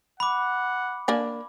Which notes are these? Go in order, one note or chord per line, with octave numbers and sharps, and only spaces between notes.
F#5 B5 D6
A#3 D4 G#5